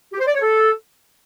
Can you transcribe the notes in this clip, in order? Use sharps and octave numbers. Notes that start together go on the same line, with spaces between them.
G4
C5
D5
C#5
A4